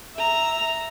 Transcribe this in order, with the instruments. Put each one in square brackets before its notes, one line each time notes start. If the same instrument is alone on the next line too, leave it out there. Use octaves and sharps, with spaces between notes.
[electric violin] E5 A#5